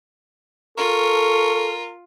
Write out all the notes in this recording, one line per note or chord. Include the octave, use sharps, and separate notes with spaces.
F4 A4 A#4 C#6